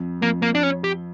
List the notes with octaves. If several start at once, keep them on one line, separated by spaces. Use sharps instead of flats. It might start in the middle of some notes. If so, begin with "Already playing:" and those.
Already playing: F2
F2 A#3
A#3
D4
C#4
G4